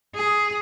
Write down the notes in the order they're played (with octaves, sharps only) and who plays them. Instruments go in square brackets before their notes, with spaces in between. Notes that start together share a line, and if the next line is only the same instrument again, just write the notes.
[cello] G#4